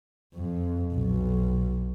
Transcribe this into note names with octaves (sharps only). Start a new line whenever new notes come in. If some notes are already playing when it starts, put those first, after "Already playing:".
F2
B1